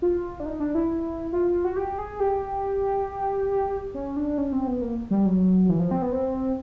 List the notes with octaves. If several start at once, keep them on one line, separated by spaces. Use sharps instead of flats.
F4
D4
D#4
D4
E4
F4
F#4
G4
G#4
G4
C#4
D4
C#4
C4
B3
A#3
G3
F#3
E3
F3
C4
B3
C4